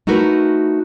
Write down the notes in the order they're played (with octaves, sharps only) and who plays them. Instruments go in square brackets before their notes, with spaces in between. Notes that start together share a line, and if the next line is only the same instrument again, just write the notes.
[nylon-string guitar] A3 D#4 E4 F#4 A#4 B4